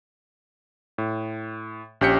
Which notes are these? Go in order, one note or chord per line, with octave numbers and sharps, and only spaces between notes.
A2
A#1 C#4 G4 G6 B6 C#7